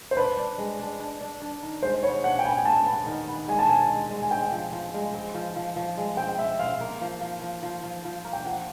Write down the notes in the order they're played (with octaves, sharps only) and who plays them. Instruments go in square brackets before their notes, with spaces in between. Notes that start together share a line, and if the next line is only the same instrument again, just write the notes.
[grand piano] C5
[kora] D4 [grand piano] B4
[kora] D4
G#3
D4
D4
D4
D4
D#3
[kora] G#3 [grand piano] C5
[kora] B3 [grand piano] C#5
[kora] D4 [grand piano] F#5
[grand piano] G5
[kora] B3 [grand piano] G#5
[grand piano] G#5
[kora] G#3 [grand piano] A5
[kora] B3
D#3
B3
[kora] G#3 [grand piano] G#5
[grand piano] A5
[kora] C4 [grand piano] G#5
[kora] G#3
G#3
[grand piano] G#5
[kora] C4 [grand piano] G5
[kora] F3
F3
G#3
C4
F3
F3
F3
G#3
[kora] C4 [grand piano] G5
[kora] C4 [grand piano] E5
[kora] C4 [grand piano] F5
[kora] A#3
F3
F3
F3
F3
F3
F3
A#3
[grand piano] G5
[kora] F3 [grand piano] F#5